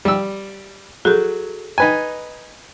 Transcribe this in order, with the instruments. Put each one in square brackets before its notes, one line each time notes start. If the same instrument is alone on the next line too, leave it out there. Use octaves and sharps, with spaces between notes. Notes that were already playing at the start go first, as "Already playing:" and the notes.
[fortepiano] G3 E6
[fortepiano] F#3 [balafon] G#4 A4
[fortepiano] D#4 B4 G#5